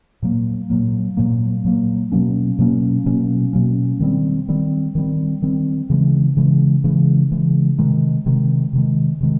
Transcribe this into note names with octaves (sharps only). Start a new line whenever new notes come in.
A#2 F#3 A#3
A#2 F#3 A#3
A#2 F#3 A#3
A#2 F#3 A#3
B2 F#3 A#3 C#4
B2 F#3 A#3 C#4
B2 F#3 A#3 C#4
B2 F#3 A#3 C#4
D#3 G3 C4
D#3 G3 C4
D#3 G3 C4
D#3 G3 C4
C#3 E3 G#3
C#3 E3 G#3
C#3 E3 G#3
C#3 E3 G#3
C3 D#3 G#3
C3 D#3 G#3
C3 D#3 G#3
C3 D#3 G#3